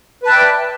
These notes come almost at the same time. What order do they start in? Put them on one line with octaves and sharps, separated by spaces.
B4 A5 E5 G5 D5